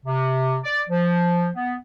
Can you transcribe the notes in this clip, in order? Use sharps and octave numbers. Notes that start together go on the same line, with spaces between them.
C3
D5
F3
B3